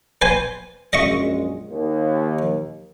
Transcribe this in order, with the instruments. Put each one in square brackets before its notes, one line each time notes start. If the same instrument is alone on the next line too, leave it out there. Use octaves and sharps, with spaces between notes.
[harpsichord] B4 C5 G#5
[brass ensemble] A#1 F#2 G#3 [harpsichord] D#5 E5 C#6
[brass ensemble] D#2